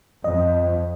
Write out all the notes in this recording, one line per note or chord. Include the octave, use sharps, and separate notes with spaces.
F2 D#5